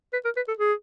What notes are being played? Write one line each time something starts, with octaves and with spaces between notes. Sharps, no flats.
B4
A#4
B4
A4
G#4